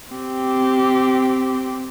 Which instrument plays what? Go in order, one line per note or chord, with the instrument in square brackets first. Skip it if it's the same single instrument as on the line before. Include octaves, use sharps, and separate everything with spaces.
[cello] C4 G4